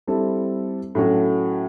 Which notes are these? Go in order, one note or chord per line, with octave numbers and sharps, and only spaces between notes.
G3 C4 E4 A4
A2 F#3 A3 C#4 F#4